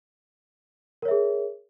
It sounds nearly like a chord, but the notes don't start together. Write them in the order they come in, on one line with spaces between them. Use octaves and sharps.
A#4 C#5 E5 G#4